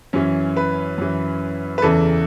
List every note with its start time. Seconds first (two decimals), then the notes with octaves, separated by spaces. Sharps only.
0.13 F#2 E3 C#4
0.57 B4
0.98 F#2 E3
1.78 B4
1.82 E2 C#3 E3 A4